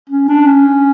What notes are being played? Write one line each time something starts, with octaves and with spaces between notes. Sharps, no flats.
C#4
D4
C#4